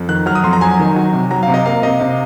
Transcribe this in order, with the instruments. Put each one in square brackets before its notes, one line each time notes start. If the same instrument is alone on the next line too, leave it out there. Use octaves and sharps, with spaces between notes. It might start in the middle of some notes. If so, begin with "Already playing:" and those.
Already playing: [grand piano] F2
D#3 F#6
F#3 F6
D#6
F2 C6
A#5
F#3 G#5
D#3
F#3
C3
F#3 A#5
F5
C3
D#5
A#3 F5
C3 D#5
C3 F5